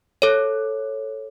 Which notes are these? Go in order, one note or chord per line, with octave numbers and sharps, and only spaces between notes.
A4 C#5